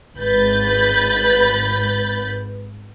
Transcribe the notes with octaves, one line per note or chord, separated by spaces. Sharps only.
G#1 G#2 B4 B5 G6 A6